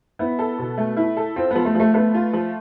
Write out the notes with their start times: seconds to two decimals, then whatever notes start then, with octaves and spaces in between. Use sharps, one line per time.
0.19 B3 E4
0.39 A4
0.59 B2
0.78 A3
0.97 E4
1.17 A4
1.36 C4 F4
1.51 F3 B3
1.65 A3
1.75 F3
1.80 A3
1.94 A3 B3
2.15 F4
2.33 F3